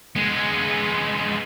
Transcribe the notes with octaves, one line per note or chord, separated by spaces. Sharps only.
G#3 B3